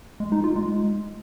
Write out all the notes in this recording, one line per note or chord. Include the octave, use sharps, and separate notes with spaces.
G#3
D#4
F4
G#3